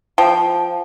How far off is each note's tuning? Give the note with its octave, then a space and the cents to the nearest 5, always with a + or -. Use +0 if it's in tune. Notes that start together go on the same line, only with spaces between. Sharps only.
F3 +0 G5 +0